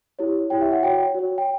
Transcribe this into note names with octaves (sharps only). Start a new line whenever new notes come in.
E4 G4 C#5
E4 G4 C#5 G5
E5
F#5
F#4 C#5 G5
F#4 C#5
G5